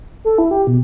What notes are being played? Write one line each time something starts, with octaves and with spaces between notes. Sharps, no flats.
A4
E4
G4
B2